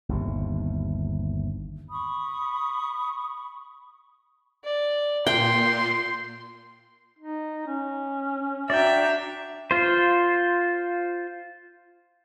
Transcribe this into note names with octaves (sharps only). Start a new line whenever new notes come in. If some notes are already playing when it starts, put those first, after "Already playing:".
G1 D#2 C3
B5 C#6 D#6
D5
A#2 G5 C6
D#4
C#4
D4 F#4 D5 E5 G5 A#5
F4 C5